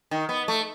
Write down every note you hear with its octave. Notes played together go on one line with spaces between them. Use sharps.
D#3
B3
A3